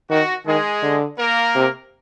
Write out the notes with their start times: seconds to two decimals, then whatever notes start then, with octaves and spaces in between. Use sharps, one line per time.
0.10 D#3 F#4
0.46 D#3 G#3 G#4
0.83 D3
1.19 A#3 A#4
1.55 C3